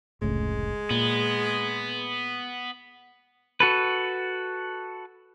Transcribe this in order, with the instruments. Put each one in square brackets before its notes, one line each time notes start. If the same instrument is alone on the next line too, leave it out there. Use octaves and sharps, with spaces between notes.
[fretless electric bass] F1 C#2 A2 [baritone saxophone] G#3
[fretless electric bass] A#2 [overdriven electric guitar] B3
[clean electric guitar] F#4 A4 B4